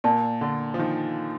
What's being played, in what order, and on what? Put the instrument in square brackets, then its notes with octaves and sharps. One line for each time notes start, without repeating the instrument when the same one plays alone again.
[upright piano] A#2 [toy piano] A#4 D5 A5
[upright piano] D3
F3
D#3